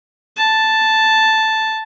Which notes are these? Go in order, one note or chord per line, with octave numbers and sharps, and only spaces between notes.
A5